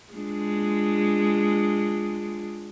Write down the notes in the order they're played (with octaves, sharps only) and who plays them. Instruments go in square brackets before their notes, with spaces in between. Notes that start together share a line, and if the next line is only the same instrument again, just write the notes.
[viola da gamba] G#3 D4 F4